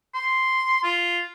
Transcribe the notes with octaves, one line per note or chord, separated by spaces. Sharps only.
C6
F4